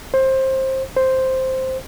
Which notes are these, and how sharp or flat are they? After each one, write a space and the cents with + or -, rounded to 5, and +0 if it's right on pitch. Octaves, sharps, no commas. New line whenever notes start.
C5 +20
C5 +0